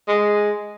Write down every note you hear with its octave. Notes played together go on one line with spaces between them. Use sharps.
G#3